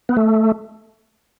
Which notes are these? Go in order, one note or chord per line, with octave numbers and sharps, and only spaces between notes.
B3
A3